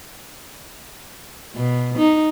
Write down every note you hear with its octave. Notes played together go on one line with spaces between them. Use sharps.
B2
D#4